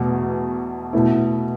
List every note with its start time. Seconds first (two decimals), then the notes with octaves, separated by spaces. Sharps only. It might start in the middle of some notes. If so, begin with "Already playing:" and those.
Already playing: E2 B2 A3
0.93 B2 A3 E4